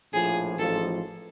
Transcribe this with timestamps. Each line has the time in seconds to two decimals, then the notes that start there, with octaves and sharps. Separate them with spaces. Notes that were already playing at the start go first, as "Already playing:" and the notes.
0.13 A#1 A2 F3 G#4
0.57 A1 G#2 F3 A4